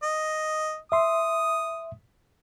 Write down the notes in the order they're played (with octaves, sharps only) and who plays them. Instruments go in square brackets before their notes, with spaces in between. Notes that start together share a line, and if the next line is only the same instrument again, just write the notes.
[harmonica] D#5
[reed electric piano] E5 C6 [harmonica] D#6